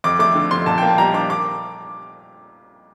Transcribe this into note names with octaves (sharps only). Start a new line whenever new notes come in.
F2 D6
A3 D6
D3
F2 C6
A#2 A5
A#3 G5
A5
G3 A#5
D4 D6
D6